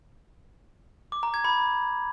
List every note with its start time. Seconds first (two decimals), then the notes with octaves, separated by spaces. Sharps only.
1.12 D6
1.23 A#5
1.34 G#6
1.44 B5